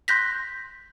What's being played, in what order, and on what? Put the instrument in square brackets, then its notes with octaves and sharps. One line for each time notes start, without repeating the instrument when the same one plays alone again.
[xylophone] C6 F#6 G6 A#6 B6